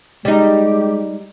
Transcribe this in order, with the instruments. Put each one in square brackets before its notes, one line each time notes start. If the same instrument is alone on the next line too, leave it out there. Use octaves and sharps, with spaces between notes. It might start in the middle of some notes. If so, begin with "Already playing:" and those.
[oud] G3 D#4 [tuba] G#3 [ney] G4